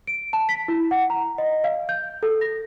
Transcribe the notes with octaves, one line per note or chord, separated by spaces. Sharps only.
D7
A5
B6
E4
F#5
A#5
D#5
F5
G6
A4
A#6